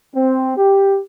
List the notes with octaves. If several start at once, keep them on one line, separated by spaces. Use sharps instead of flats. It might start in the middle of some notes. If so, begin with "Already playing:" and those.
C4
G4